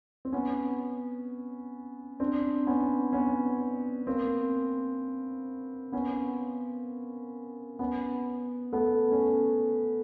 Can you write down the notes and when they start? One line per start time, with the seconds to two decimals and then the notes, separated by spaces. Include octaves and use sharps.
0.25 C4
0.33 B3 C#4
2.20 C4 D4
2.67 B3 C#4
3.13 B3 C#4
4.07 A#3 C4
5.92 B3 C#4
7.79 B3 C#4
8.73 A3 B3
9.12 C#4